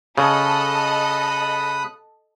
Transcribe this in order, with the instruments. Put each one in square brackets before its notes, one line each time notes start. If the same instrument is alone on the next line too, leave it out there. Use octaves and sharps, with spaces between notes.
[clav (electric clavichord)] C#3 [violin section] A4 D#5 [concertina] B5 D#6 F#6